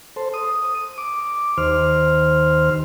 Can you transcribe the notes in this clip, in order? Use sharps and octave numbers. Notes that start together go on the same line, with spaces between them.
A4 C5
D#6
D6
D#2 C5 F6